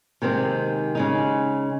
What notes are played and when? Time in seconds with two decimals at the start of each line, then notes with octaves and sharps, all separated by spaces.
0.22 C3 D#3 G#3 C4
0.95 C#3 G#3 D#4